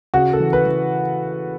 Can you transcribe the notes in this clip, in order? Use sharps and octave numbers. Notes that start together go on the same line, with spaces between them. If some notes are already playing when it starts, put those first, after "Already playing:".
C#3 F#4
A4
E3
B4
E3